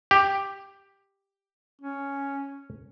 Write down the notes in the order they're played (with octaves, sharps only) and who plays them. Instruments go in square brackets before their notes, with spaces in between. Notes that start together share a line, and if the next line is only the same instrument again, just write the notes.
[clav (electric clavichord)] G4
[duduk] C#4